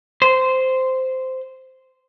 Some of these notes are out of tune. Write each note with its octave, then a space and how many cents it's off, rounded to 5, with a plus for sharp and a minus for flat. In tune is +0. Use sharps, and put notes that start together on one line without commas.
C5 -10